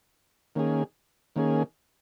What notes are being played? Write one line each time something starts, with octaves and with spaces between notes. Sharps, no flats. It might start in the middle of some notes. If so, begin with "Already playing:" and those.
D#3 A#3 C#4 G#4
D#3 A#3 C#4 G#4